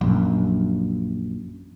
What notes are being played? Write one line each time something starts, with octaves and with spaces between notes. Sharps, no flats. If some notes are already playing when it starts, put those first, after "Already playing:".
A#1 F#2